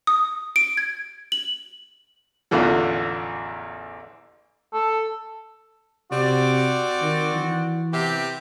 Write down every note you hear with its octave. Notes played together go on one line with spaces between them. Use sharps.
D#6
D7
G#6
F#7
A1 E2 D3 E3 F3
A4
C3 C4 F#4 D5
D#3
E3
C3 B3 G4